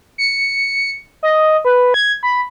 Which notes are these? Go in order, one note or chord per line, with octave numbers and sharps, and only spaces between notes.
C#7
D#5
B4
G#6
B5